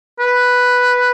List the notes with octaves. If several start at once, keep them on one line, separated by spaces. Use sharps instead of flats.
B4